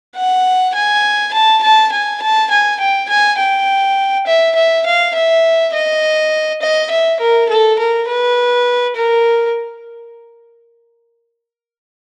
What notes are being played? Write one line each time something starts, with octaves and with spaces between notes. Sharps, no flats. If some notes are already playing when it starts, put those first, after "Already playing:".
F#5
G#5
A5
A5
G#5
A5
G#5
G5
G#5
G5
E5
E5
F5
E5
D#5
D#5
E5
A#4
A4
A#4
B4
A#4